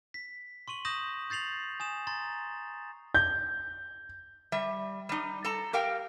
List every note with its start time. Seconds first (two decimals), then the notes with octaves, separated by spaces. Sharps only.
0.14 B6
0.68 C6 C#6 D#7 F#7
0.85 C#6 D#6 G6 A#6 E7 F#7
1.30 G6 A6 C7 F7 F#7
1.80 G#5 D#6 E7
2.07 A#5 C6 A6
3.15 G6
4.52 G3 E5
5.09 G3 D#4
5.45 A4 A#5
5.73 G4 A#4 F5 G5